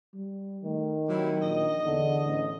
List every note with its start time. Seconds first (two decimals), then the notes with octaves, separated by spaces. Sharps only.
0.14 G3
0.64 D#3 A3
1.09 C3 F#3 E4
1.42 A#1 D#5
1.86 E2 D3
2.25 A1